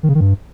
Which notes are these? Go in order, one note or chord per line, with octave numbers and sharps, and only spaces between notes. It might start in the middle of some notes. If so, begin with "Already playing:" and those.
D#3
C#3
D#3
G2